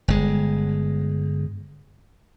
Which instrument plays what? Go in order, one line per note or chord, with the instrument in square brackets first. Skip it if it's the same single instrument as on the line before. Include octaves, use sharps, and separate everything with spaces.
[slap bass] G1 G#3